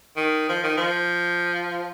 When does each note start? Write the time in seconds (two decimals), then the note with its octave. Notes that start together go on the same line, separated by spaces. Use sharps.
0.16 D#3
0.49 F3
0.63 D#3
0.77 F3